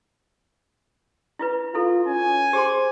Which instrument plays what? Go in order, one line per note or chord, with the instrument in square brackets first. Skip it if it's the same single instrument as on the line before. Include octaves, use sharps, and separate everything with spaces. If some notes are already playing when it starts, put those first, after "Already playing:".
[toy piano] E4 F4 B4
[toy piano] E4 A4 [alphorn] F4
[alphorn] C#4 [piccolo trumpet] G#5
[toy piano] G4 G#4 C6 [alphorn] C5